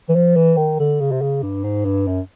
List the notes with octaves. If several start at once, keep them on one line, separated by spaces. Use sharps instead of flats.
E3
F3
E3
D#3
D3
C#3
C3
C#3
G2
G#2
G2
F#2